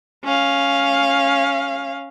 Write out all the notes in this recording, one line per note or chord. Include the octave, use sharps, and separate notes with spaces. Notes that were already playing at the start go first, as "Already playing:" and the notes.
C#4 F5